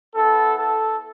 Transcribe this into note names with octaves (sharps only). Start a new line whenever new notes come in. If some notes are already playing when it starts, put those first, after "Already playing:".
B3 E4 A4
A4